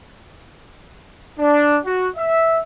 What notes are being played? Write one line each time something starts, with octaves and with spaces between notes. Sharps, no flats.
D4
F#4
E5